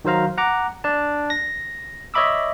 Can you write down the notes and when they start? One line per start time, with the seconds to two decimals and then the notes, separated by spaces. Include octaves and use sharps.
0.05 D#3 F#3 C5 F5 A#5
0.38 F#5 A#5 D6
0.84 D4 A5
1.30 A#6
2.14 C#5 D#5 E5 B5 D6 E6